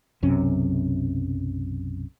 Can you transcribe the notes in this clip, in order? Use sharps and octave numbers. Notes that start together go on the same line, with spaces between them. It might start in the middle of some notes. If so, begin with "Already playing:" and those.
B1 F#2 C3 C#4